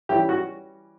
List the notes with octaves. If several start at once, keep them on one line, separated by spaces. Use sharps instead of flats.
E3 G3 C#4 E4 G4
F#4